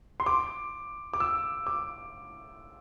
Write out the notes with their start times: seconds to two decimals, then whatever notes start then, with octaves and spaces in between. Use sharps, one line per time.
0.20 C6
0.26 D6
1.14 D6
1.20 E6
1.67 D6